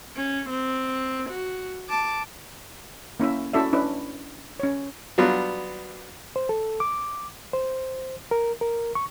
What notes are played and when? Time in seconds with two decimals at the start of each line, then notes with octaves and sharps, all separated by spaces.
0.16 C#4
0.49 C4
1.30 F#4
1.89 A5 D6
3.20 A#3 C#4 E4 E5
3.53 C#4 E4 F#4 A4 D5 E5
3.73 C#4 D4 E4 B4
4.60 C#4 C#5
5.18 F#3 G3 B3 D4 F4
6.36 C5
6.49 A4
6.80 D6
7.53 C5
8.31 A#4
8.61 A#4
8.95 C#6